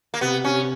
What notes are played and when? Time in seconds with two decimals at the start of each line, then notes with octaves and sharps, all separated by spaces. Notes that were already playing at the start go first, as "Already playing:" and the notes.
0.14 A#3
0.21 C3 B3
0.44 C3 C#4